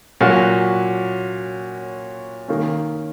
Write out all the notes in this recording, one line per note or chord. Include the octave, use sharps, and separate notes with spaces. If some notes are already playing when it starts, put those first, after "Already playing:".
A#2 F#3 C#4 F#4
D#3 A#3 C#4